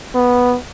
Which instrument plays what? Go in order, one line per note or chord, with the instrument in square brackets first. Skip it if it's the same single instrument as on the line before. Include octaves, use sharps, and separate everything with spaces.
[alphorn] B3